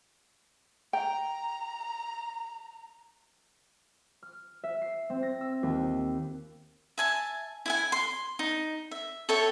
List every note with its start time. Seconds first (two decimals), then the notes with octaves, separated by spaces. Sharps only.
0.93 G5 A#5
4.23 F6
4.64 E5
4.82 C7
5.10 C4
5.23 A#6
5.41 E6
5.63 D#2
5.82 D#4
6.98 E5 G#5 A5
7.66 E4 E5 G#5
7.92 C6
8.39 D#4
8.91 E5
9.29 A4 C#5 E5 G5